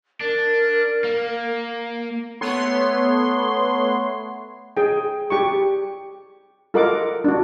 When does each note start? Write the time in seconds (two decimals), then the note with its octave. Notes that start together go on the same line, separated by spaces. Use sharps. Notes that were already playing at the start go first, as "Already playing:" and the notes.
0.21 D4 A#4
1.04 A#3
2.41 A3 B3 B4 C#5 C6
4.77 G#4 G5
5.30 G4 C#6
6.74 F4 A4 A#4 D#5 F#5 D6
7.24 D4 F#4